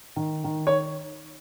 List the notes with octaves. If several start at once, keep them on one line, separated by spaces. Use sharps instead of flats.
D#3
D#3
C#5